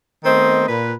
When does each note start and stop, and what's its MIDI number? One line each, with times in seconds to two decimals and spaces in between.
0.24 0.68 51
0.24 0.68 57
0.24 0.68 59
0.24 0.68 60
0.24 0.68 72
0.24 0.68 75
0.68 0.93 46
0.68 0.93 71